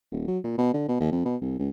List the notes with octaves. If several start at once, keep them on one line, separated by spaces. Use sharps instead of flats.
D#1
F#3
A#2
B2
D3
B2
D#2
F2
B2
C2
C#2